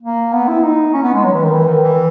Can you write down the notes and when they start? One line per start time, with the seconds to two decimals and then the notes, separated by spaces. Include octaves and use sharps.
0.03 A#3
0.33 B3
0.48 E4
0.63 D#4
0.93 C#4
1.03 B3
1.14 G#3
1.24 F#3
1.33 E3
1.43 D#3
1.53 E3
1.69 D#3
1.83 E3